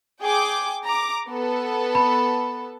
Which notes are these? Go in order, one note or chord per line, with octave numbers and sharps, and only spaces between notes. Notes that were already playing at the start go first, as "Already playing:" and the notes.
G#4 G5 D6
A#5 D6
B3 A4
B5